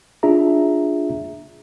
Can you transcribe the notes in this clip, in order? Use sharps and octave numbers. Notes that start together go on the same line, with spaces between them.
D4 F4 G#4 E5 A#5